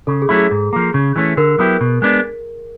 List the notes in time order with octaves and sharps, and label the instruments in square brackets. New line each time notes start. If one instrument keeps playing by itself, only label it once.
[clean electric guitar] C#3 [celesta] A4
[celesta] G#4
[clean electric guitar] F#3 A3 C#4 E4
[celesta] G#4
[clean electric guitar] G#2
F3 A#3
C#3
E3 A3 C#4
[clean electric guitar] D3 [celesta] A#4
[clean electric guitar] F#3 B3 E4 G4
B2
G#3 B3 D4